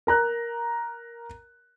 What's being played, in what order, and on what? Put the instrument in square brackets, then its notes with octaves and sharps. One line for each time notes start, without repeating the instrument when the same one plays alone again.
[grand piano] A#4 A#5 F#6